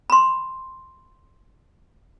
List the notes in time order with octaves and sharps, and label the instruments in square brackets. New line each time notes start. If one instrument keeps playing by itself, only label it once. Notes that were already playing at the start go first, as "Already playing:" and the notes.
[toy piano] B5 C6